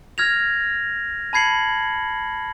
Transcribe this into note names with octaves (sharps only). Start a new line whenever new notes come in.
F6 G#6 A#6 F7
A5 B5 G#6 C7 C#7 F#7